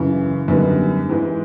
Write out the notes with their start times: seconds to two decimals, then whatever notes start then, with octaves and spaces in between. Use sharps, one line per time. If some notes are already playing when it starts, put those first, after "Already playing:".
Already playing: F#2 C#3 E3
0.48 F#2 D3 G3 B3 D#4
1.09 G#2 E3 G#3